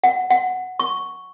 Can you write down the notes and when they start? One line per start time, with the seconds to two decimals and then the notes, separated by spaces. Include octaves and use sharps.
0.04 F#5
0.30 F#5
0.79 C#6